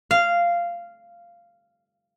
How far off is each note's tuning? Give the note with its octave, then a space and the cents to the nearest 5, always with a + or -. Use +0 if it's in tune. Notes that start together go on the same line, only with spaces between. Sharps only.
F5 -10